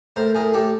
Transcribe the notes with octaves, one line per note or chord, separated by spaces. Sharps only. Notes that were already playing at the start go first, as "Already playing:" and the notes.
A2 A#4 C5
A2 G#4 A#4
A2 G4 A4